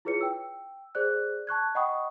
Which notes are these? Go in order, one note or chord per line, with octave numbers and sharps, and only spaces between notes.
E4 F4 G#4 B4 C#5 C#7
G5 E6
G#4 C5 D5 F#6
A5 C#6 F#6 G#6
D#5 F#5 G5 B5 C#6 D#6